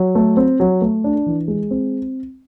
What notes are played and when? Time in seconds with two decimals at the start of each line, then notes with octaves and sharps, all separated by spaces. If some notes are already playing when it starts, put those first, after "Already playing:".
Already playing: F#3
0.15 A3
0.37 C4
0.60 F#3
0.82 A3
1.04 D4
1.26 E3
1.48 G#3
1.71 C4